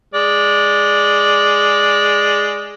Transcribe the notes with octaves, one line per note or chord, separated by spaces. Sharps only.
G#3 D5